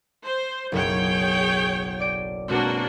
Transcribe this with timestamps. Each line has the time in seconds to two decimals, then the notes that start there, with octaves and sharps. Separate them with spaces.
0.24 C5
0.72 F#1 B1 G#4 C#5 G5
2.00 D5 D7
2.48 B2 G#3 A#3 C4 D4 F#4